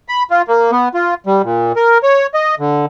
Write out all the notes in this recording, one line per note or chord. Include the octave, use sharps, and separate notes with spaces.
B5
F4
A#3
B3
F4
G3
A#2
A#4
C#5
D#5
D3